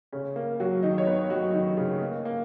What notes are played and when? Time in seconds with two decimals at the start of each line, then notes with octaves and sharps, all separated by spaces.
0.12 C#3 C#4
0.36 A#3
0.60 F#3 F#4
0.83 D#3 D#4
0.98 C#5
1.07 B3 B4
1.30 F#3 F#4
1.53 D#3 D#4
1.77 C#3 C#4
2.01 A#3
2.25 A#3